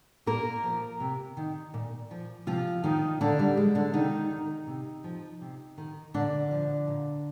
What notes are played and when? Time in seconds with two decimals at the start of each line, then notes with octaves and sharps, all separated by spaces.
0.26 A#2 A#3 A#4
0.64 F3
1.00 C3
1.37 D#3
1.74 A#2
2.11 F3
2.47 C3 F3 F4
2.84 D#3 F3 D#4
3.21 A#2 D3 D4
3.39 G3
3.57 F3 G#3
3.75 D3 D4
3.94 C3 D#3 D#4
4.30 D#3
4.67 C3
5.04 F3
5.41 C3
5.78 D#3
6.14 A#2 D3 D4
6.51 F3
6.88 A#2